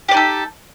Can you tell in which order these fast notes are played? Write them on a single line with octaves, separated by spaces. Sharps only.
G4 D5 D#4 A4